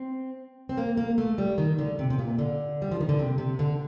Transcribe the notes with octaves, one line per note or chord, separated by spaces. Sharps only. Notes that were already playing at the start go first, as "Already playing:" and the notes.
Already playing: C4
C4
A#3
A#3
A3
G3
D#3
D3
C3
C3
A#2
D3
G3
F3
D#3
D3
C3
C3
D3